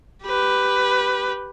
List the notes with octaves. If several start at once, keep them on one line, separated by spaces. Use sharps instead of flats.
G4 B4